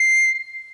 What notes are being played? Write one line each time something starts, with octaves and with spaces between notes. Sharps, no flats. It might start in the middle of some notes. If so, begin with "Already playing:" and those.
Already playing: C7